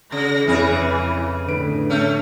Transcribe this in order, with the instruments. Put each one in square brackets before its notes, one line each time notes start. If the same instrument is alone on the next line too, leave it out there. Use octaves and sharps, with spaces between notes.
[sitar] C#3 [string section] A#6
[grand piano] F2 [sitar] C#3 G#4 [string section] E3
[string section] A2 [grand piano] D3 B4 D7
[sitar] A3 C#4